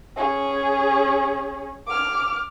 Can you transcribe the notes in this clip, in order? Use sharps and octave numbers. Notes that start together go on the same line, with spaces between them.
C#4 G#4
D6 F6